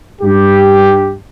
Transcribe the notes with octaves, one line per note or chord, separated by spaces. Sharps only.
G2 G4